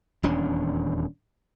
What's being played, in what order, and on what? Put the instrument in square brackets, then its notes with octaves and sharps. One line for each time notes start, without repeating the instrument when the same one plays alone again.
[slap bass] D#1 E2 C#4 D4